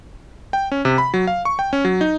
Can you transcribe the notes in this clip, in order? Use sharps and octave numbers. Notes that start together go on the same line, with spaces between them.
G5
C#4
C3
B5
F#3
F5
C#6
G5
C#4
F#3
D#4